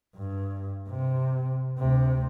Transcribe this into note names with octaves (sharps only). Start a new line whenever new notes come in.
G2
C3
D2 C3